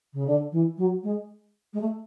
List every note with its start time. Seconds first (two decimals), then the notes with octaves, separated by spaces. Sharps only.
0.13 C#3
0.27 D3
0.52 E3
0.77 F#3
1.03 G#3
1.73 G#3
1.80 A3